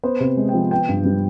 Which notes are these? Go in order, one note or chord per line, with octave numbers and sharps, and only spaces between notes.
B3 C5
C3
G#3
F3 G5
B3 G5
G2
G3